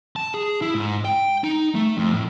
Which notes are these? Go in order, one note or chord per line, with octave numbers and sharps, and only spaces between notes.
A5
G#4
E4
G#2
G5
D#4
A3
F2
A2